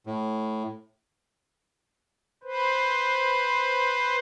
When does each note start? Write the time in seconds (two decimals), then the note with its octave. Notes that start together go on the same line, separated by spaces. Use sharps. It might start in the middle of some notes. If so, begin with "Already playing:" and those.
0.06 A2
2.43 B4 C5